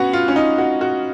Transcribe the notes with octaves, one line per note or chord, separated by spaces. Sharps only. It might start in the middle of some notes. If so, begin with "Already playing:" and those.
Already playing: B3 C#4 F#4
F4
C#4
D#4
F#4
F#4